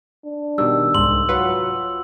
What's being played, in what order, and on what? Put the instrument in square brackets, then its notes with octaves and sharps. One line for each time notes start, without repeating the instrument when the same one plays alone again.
[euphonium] D4
[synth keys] B2 D#3 G3 [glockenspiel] E6
[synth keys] C2 G#2 [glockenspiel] C6 F#7
[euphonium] F#3 [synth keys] F4 B4 F#5